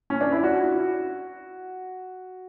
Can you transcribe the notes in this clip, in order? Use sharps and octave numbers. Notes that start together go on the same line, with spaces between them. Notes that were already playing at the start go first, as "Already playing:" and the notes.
C#4
D4
E4
F#4